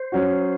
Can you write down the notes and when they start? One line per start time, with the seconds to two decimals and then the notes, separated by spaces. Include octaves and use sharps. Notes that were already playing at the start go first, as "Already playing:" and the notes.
Already playing: C5
0.12 F#3 C#4 F#4